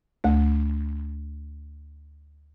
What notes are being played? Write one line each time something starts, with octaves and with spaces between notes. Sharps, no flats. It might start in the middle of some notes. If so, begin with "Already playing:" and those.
D2 A3